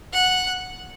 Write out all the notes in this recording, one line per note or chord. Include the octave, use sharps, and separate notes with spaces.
F#5